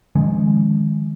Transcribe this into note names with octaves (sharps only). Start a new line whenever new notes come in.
D#3 F3 G#3 C#4